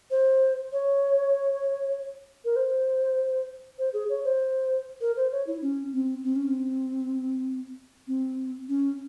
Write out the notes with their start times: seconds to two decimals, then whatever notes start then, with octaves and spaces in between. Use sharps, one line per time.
0.11 C5
0.72 C#5
2.45 A#4
2.56 C5
3.78 C5
3.93 G#4
4.09 C#5
4.24 C5
5.01 A#4
5.16 C5
5.32 C#5
5.47 E4
5.62 C#4
5.93 C4
6.24 C4
6.36 C#4
6.48 C4
8.07 C4
8.68 C#4